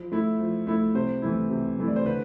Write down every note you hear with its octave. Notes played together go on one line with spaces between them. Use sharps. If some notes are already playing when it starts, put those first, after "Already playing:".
Already playing: F3
A3 E4
F3
A3 E4
C3 C5
E3 A3 E4
C3
E3 A3 E4
D5
C5
D3 B4